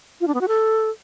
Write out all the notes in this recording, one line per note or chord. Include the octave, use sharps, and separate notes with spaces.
F4
D4
B3
F#4
A4